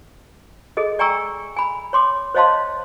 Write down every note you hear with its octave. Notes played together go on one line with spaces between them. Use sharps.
G#4 A4 D#5
D5 G5 G#5 A#5 C#6 E6
G#5 B5
C#5 C6 D6
C5 C#5 D#5 F5 A5 C6